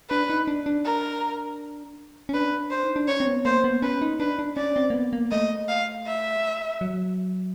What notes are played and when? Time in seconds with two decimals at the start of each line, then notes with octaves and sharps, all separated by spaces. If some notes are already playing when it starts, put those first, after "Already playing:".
0.10 D4 B4
0.30 D#4
0.47 D4
0.66 D4
0.85 A#4
2.29 C#4
2.33 D4 B4
2.71 C5
2.83 D#4
2.96 D4
3.08 C#4 C#5
3.20 C4
3.27 B3
3.45 A#3 C5
3.64 B3
3.82 C#4 B4
4.02 D#4
4.20 D4 B4
4.39 D4
4.57 C#4 D5
4.76 C4
4.90 A#3
4.94 B3
5.13 A#3
5.31 A3 D#5
5.68 F5
6.07 E5
6.81 F#3